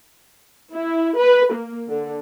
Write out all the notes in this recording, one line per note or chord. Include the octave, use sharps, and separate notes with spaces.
E4
B4
A#3
D3